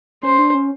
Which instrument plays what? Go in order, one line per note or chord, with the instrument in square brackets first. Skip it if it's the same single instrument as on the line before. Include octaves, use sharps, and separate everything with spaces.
[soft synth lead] C#4 [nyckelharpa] C5
[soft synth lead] D4
C#4